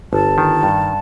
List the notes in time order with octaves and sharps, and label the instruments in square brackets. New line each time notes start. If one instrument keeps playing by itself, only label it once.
[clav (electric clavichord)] G1 [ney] A5
[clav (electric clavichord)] D#3
G2